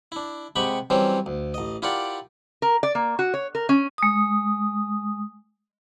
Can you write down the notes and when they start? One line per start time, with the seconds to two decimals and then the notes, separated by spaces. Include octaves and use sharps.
0.12 D4 E4
0.56 C3 G#3 G4 F#5 B5 C#6
0.90 E3 F#3 G3 C4 C#4 C5
1.26 D2
1.54 A1 D#5
1.82 E4 F4 G4 A#4 D5 F#5
2.62 A#4
2.83 D5
2.95 A#3
3.19 F#4
3.34 C#5
3.55 A#4
3.69 C#4
3.98 G#3 D#6